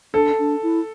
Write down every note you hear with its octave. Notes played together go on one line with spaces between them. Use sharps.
D4 A4
D4
E4